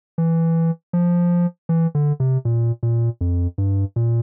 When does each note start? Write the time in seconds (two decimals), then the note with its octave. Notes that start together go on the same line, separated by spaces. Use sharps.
0.18 E3
0.93 F3
1.69 E3
1.95 D3
2.20 C3
2.45 A#2
2.83 A#2
3.21 F2
3.58 G2
3.96 A#2